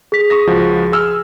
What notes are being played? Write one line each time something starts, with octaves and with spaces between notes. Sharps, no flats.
G#4 B6
C#6 D#6 A#6
C#2 F3 F#4
G#4 E6 F6